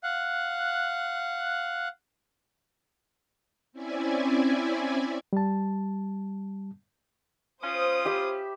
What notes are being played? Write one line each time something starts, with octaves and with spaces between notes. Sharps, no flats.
F5 F#5 F#6
C4 C#4 E4 D5 E5 G#5
G3 A5
C#4 F4 C5 D#6
G4 E5 B5